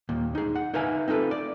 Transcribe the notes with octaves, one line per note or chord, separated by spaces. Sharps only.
D#2 A#2
D#4 G#4
F#5
D#4 A#4 B4 E5 F5 G#5
C4 D#4 F4 A4 B4
D5